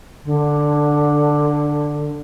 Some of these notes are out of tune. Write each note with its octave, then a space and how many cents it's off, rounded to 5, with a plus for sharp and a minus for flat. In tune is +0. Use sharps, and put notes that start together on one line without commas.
D3 +5